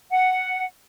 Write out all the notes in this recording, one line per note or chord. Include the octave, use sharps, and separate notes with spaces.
F#5